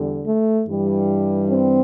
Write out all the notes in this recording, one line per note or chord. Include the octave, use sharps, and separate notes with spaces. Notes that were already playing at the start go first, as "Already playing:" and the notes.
Already playing: E2 D3 G3
A3
G2 E3 G3
C4